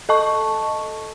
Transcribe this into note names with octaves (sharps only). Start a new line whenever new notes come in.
A4 D#5 A5 C#6